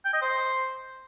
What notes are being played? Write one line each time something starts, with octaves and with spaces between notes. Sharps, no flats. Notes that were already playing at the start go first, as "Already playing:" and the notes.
G5
D#5
C5